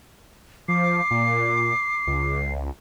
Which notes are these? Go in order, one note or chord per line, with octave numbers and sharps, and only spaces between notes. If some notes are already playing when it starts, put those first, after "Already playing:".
F3 D6 C7
A#2
C#2